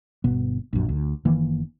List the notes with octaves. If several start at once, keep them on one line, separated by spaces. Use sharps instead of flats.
G1 B2 B3
A#1 F#2
D2
F#1 D#3 E3 A#3